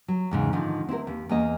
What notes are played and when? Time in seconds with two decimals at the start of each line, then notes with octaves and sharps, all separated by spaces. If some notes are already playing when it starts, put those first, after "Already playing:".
0.08 F#3
0.31 E2 G#2 C#3
0.53 G#2 D3 D#3 F3
0.89 C4 E4 G4 A#4
1.07 D#2
1.29 E2 A#3 D#5